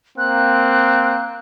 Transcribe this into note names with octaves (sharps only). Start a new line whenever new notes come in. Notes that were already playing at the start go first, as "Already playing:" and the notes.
A#3 C4 F#6